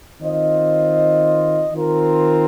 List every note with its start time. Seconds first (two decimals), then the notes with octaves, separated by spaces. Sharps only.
0.20 D#3 C4 F4 C5 D#5
1.73 D#3 C4 F4 A#4